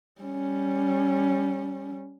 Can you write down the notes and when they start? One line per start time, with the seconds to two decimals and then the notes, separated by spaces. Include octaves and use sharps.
0.22 G3 C#4